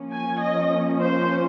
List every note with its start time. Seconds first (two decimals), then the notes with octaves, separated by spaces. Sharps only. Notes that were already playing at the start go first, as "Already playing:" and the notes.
Already playing: F3 A#3 C#4
0.14 G#5
0.42 D#5
1.01 C5